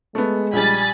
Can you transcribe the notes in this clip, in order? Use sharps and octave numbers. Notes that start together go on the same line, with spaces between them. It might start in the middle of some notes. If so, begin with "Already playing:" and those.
G#3 A3 B3
A#1 G3 G#5 B5 A6